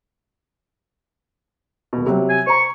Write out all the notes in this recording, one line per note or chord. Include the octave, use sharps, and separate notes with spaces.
D#1 B2
C3 F#3 G3
G#5
C5 A#5 C#6